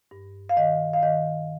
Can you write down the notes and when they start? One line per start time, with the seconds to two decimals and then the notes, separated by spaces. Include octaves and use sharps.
0.11 G2
0.49 F5
0.57 D#3 D#5
0.93 F5
1.03 D#3 D#5